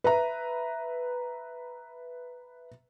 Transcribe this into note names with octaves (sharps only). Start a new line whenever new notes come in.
B4 E5 A#5